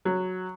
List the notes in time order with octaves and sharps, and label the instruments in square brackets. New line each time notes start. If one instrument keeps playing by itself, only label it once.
[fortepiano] F#3